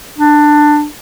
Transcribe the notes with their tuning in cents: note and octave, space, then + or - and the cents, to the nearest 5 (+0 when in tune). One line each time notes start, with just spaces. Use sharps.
D4 +15